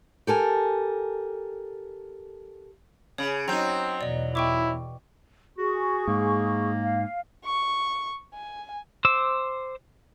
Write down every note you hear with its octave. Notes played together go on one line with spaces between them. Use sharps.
G4 A4 A#4 G#5
C#3 C#5 B5
F#3 C4 D#4 A#5 G6
E2 B2 E3 D5 D#5
E4 G5 C#6 D6
F#4 G#4 C#6
G#2 A#3
F5
C#6
G#5
C5 D6 E6